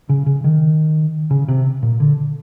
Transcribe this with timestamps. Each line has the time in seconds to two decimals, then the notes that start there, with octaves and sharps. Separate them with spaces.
0.09 C#3
0.26 C#3
0.44 D#3
1.31 C#3
1.48 C3
1.83 A#2
2.00 D3